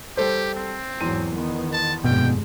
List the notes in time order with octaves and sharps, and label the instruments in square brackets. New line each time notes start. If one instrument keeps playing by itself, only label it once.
[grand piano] G3 A4 C5 [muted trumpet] G4
[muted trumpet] C4
[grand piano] E2 C6 D#7 [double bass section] G#2 F#3
[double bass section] D#3 B3
[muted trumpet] A5
[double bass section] F1 G2 G#3 [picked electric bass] B2 [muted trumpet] G5